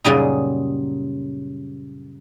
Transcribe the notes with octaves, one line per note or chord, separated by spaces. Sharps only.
F#2 A#2 C#3 G3 D#4